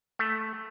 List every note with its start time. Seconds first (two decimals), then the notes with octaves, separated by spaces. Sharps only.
0.19 A3